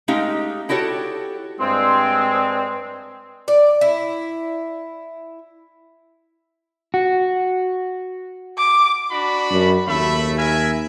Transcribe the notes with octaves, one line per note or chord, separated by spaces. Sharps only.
G#3 A3 C#4 D#4 G4 F5
E4 F#4 G4 A4 C#5
G2 G#3 C4
D5
E4
F#4
D6
D4 F#4 B5
F#2
D#2 A3 E5 B5
A#4 E5 G#5